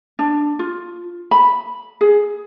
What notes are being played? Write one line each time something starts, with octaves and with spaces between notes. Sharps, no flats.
D4
F4
B5
G#4